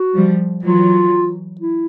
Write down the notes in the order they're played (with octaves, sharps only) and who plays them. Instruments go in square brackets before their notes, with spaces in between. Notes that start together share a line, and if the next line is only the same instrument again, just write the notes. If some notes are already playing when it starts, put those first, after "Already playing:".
Already playing: [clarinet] F#4
[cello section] F3 G3
[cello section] E3 F#3 [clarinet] F4
[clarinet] E4